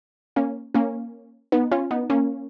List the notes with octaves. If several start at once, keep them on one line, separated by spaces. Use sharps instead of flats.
A#3 C#4
A#3 C#4
B3 D#4
C#4 F4
B3 D#4
A#3 C#4